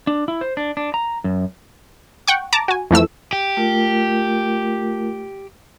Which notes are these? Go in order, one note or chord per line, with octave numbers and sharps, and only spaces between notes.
D4
E4
C5
D4
D4
A#5
F#2
F#5 G5 C#6
A5 A#5 D6
F#4 G#5
F2 E3 A3 E6
G4
A3 F4 A#4